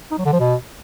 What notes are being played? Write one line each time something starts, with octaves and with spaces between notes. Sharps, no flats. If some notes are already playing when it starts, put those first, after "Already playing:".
D#4
F#3
D3
F3
B2